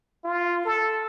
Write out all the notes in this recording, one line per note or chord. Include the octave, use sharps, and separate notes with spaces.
F4
A4